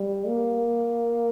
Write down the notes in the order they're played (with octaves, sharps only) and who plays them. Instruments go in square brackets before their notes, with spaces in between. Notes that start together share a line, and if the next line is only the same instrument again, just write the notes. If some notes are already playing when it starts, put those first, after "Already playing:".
Already playing: [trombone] G3
A#3